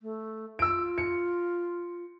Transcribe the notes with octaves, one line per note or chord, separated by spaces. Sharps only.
A3
F4 E6 D7
C#7